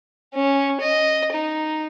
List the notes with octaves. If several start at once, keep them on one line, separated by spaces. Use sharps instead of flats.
C#4
D#5
D#4